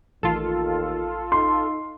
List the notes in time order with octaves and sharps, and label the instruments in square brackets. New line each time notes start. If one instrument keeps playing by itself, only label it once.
[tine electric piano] A1 [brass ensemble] D#2 D#3 [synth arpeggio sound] F4 A4
[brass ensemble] D#4 [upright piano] C6